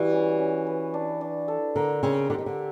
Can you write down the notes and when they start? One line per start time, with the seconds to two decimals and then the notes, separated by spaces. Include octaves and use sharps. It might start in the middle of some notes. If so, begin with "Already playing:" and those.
Already playing: E3 G3 F#4
0.12 C#4
0.39 C#4
0.67 B4
0.94 D4
1.21 D4
1.48 A4
1.76 D3 A#4
2.03 C#3 C4
2.30 D3 G4
2.38 D#3
2.46 D3